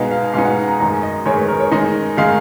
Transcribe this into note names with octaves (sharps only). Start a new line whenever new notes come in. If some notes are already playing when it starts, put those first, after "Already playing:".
Already playing: B2 G#3 B3 D#4 F5
F5
B2 G#3 B3 D#4 F5
F#5
A#5
F#2 D#3 G#3 A#5
D#5
F#2 D#3 G#3 C#5
B4
A#4
C#5
D#3 G#3 D#4 D#5
D#3 G#3 D#4 F5